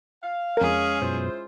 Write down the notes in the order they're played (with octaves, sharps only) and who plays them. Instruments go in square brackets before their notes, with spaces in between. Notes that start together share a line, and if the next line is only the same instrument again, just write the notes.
[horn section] F5
[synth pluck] F2 A#4 [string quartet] G#3 C#4 G#4
[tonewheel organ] F#2 B2 [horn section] E4 F4 C5